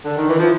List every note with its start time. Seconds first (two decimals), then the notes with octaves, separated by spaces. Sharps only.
0.05 D3
0.17 D#3
0.28 E3
0.39 F3